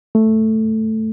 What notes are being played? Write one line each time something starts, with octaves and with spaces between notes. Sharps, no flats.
A3